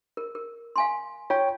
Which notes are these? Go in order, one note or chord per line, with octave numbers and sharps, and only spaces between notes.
A#4
A#4
F5 G#5 C6
F4 C#5 G5